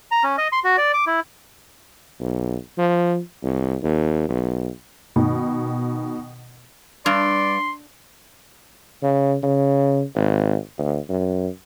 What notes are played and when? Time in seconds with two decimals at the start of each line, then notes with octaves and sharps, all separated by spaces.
0.11 A#5
0.24 C#4
0.38 D#5
0.52 C6
0.64 F#4
0.78 D5
0.94 D6
1.07 E4
2.20 B1
2.78 F3
3.43 C2
3.83 D#2
4.29 B1
5.16 B2 D#3
7.06 G2 D5 C6
9.02 C#3
9.43 C#3
10.16 G#1
10.78 D2
11.10 F#2